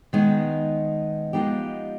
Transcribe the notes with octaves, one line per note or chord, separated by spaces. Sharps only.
D#3 G#3 B3 D#4
F3 G#3 B3 D#4 G4